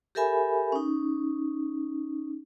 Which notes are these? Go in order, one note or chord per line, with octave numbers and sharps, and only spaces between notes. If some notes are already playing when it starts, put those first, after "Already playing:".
G4 A4 A#4 E5 G#5 B5
C#4 D#4